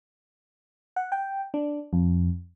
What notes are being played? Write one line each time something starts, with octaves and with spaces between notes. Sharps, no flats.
F#5
G5
D4
F2